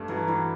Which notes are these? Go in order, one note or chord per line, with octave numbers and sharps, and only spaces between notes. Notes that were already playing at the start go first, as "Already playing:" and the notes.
Already playing: G2 A3
E3 F#3
E3 G3